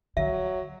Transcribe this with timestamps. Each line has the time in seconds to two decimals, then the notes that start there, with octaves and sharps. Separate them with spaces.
0.17 D3 F#3 E5